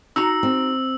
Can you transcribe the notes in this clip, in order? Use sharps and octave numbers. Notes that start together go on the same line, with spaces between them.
D#4 F#4 A#5 E6
C4